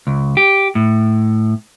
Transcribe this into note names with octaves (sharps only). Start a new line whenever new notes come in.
C#2
G4
A2